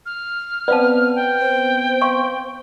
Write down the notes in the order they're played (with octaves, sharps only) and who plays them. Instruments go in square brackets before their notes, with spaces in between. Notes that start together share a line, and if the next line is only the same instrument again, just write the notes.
[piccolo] F6
[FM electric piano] B3 C4 [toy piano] D5 F5 A5
[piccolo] G5
[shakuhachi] C5
[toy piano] F5 C6 C#6